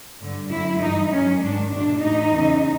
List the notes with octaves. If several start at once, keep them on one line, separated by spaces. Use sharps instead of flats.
G2 D3
F#2 D3 E4
G2 E3 D#4
F#2 D#3 C#4
G#2 D#3 D4
E2 B2 D4
A2 E3 D#4
E2 C#3 E3